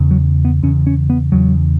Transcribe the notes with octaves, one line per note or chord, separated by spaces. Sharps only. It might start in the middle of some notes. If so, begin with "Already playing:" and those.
Already playing: E2 C#3
F#3
B3
E2 C#3 C#4
C#4
B3
E2 C#3 F#3